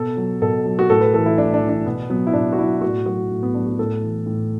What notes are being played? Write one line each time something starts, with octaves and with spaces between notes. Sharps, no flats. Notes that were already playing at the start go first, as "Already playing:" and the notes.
Already playing: B2 A4
F#3
B2 A4
F#3
F#4
A2 A4
B4
E3 A4
E4
A2 D4
D4
E3
D4
B2 B3
F#3 B3
E4
B2 D4
F#4
F#3 E4
A2 F#4
F#3 F#4
A2
B3
F#3 D4
F#4
A2 A4
E3
A2